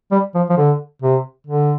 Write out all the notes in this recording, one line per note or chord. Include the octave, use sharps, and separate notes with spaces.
G3
F3
F3
D3
C3
D3